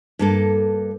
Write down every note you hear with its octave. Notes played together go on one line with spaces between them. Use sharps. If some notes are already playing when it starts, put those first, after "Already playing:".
G2 A#3 A4